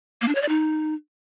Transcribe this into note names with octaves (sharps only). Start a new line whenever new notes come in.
A#3
D4
C#5
D5
D#4